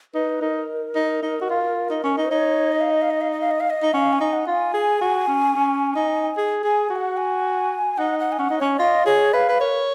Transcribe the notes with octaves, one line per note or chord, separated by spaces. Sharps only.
D#4 B4
D#4 A#4
D#4
D#4
F#4
F4
D#4
C#4
D#4
D#4 C#5
D#5
F5
D#5
F5
D#5
F5
D#5
F5
D#5
F5
D#5
D#4
C#4 F5 F#5
G#5
D#4
F#5
F4
G#5
G#4
F#4
C#4
C#4
D#4
G#4
G#4 G#5
F#4 G#5
F#5
G#5
D#4 F#5
F#5
G#5
C#4 F#5
D#4
C#4 C#5
F4 D#5
G#4 C#5
B4 F5
B4
A#4 C#5